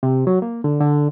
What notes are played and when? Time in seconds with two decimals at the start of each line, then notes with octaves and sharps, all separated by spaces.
0.03 C3
0.27 F#3
0.42 A#3
0.64 D3
0.81 D3